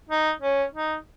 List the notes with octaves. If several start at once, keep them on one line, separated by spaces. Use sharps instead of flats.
D#4
C#4
D#4